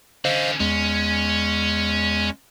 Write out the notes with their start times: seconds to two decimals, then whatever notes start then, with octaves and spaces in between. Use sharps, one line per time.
0.25 D3 C#4 C5 D#5 F5
0.60 E2 G#3 C#4